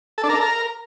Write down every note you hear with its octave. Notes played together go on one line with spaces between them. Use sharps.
A4
D4
A#4
A4
A#4